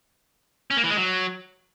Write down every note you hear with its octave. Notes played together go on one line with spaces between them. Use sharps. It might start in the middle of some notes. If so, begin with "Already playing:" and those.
C#4
A#3
E3
G#3
F#3